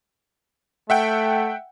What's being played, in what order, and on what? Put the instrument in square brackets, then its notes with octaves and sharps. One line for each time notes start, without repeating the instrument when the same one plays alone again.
[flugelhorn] A3 [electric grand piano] E5 F#5 G5